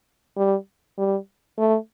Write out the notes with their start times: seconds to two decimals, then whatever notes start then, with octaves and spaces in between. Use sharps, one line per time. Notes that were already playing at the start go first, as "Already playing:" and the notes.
0.37 G3
0.98 G3
1.58 A3